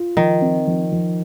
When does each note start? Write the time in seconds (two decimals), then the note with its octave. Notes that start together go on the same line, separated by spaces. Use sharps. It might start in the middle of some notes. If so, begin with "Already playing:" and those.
Already playing: F4
0.17 D#3 F3
0.42 C4
0.67 F3
0.92 F3